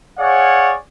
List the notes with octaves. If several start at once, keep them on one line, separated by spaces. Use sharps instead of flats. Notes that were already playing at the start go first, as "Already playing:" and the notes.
G#4 C#5 D5 F5 F#5